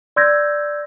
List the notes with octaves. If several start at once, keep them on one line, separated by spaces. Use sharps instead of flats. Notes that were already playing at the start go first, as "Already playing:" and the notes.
D5 C6 E6 G6 G#6 A#6